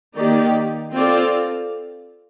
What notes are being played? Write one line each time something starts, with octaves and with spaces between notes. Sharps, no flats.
D#3 A#3 D#4 G4 D5
C4 F4 A4 D5